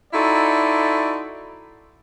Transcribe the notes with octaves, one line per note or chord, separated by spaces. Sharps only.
D#4 E4 F#4 A4 D5 C6